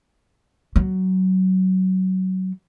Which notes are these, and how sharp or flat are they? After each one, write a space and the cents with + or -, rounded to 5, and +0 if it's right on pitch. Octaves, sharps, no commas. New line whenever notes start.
F#3 +15